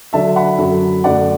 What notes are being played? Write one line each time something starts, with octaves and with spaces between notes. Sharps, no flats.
D3 F#3 D4 E5 A5
F#5 B5
F#2 D3 F#3
F#2 D3 A3 D5 F#5